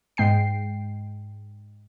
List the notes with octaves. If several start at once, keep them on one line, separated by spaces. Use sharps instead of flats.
G#2 G#3 G5 C7